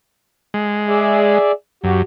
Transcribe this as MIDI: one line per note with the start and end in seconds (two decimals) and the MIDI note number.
0.54 1.38 56
0.88 1.52 68
0.88 1.52 74
0.88 1.52 76
1.84 2.03 42
1.84 2.00 66
1.84 2.00 67